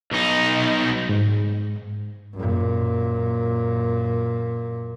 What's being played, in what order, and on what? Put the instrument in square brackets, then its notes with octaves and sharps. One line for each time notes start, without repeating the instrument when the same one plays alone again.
[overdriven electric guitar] B1 D#4
[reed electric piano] G#2
[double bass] F#2 A#2